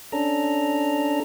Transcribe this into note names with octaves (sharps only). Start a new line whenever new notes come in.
C#4 D4 A4 A#5